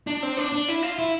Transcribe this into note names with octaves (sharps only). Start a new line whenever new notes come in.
D4
C4
D4
D4
E4
F4
E4